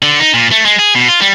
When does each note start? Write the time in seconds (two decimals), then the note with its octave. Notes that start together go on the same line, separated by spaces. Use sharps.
0.02 D3
0.20 D#4
0.34 A#2
0.51 A3
0.65 G#3
0.79 G#4
0.95 B2
1.08 F4
1.21 G3